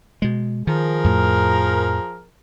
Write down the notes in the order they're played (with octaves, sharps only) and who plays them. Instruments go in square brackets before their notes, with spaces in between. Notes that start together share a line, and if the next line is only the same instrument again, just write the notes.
[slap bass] B2 G#3
[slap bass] D#3 [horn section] F3 G#4 A#4
[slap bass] F2 A2